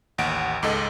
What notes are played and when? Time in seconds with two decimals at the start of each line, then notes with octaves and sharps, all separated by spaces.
0.18 A1 D#2 F#5 D7
0.63 C#2 G#2 A4 D#5